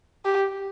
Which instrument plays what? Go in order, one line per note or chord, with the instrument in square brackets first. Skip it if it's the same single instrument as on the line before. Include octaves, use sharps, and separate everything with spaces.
[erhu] G4